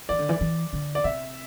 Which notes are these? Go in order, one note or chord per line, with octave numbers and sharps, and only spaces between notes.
E3 D5
D3
E3
E3
D3
D5
C3 E5